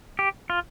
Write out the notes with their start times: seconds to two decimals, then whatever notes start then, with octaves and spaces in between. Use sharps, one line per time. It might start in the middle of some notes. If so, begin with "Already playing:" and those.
0.19 G4
0.50 F4